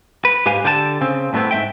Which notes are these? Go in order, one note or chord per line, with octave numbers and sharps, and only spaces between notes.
B4
G#2 G4 B4 F5 G#5
D3 G4 A4 F5 A5
C#3 C4
A2 G3 A3 B3 C4
G#2 E5 G5